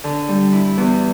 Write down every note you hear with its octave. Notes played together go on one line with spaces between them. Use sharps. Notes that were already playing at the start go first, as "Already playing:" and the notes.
D3
G3
E4
E2